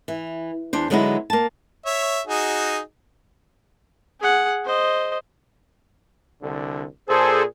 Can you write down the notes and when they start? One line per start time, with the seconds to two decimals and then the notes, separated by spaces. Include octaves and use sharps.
0.08 E3
0.73 E2 D4 C5
0.90 D3 F#3 G#3 B3 D#4 E4
1.30 A#3 A5
1.86 C#5 E5
2.27 D#4 F#4 G#4
4.21 G#4 F#5
4.65 C5 D#5
6.43 C2 D3
7.09 A#2 G#4 A4 C5